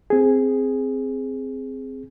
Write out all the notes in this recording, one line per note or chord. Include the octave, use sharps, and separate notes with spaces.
C4 G#4